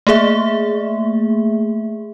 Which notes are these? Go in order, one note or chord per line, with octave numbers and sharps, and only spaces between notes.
A3 A#3 G#4 E5